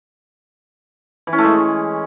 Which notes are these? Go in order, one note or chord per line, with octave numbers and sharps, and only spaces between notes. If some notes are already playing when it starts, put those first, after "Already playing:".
E3
C#4
A3
G#3